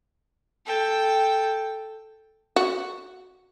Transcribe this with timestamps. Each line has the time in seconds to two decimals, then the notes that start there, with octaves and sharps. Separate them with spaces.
0.66 A4 G5
2.56 F#4